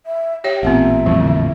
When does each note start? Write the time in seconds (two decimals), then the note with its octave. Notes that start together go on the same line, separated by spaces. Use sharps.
0.06 E5
0.44 G4 C#5 E5 G5
0.63 A1 A#2 B3 C4 E5 F#5
1.06 A#1 F2 A2 E3 G3
1.20 D3